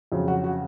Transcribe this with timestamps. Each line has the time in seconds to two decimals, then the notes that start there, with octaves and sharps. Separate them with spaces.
0.12 F2 C#3 F#3
0.28 F#4
0.44 F#4